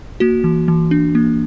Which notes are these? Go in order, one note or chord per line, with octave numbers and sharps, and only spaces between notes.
A#3 F#4
E3
E3
D4
A#3